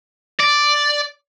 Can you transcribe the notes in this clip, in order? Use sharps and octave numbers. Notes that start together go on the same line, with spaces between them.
D5